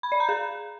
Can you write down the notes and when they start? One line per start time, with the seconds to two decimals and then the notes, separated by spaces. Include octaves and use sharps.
0.03 B5
0.12 D5
0.20 A#5
0.29 G#4